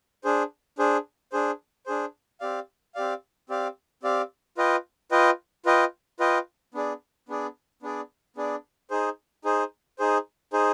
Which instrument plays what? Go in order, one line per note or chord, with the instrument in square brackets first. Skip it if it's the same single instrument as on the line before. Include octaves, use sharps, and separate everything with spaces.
[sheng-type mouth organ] D4 G#4 C5
D4 G#4 C5
D4 G#4 C5
D4 G#4 C5
C4 G4 D5 F5
C4 G4 D5 F5
C4 G4 D5 F5
C4 G4 D5 F5
F4 B4 D#5 G5
F4 B4 D#5 G5
F4 B4 D#5 G5
F4 B4 D#5 G5
B3 D4 G#4 D5
B3 D4 G#4 D5
B3 D4 G#4 D5
B3 D4 G#4 D5
D#4 G#4 C5
D#4 G#4 C5
D#4 G#4 C5
D#4 G#4 C5